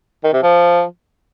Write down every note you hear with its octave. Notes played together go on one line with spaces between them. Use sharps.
D#3
C3
F3